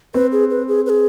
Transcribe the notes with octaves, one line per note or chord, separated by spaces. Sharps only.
C4 B4
G#4
B4
G#4
B4
G#4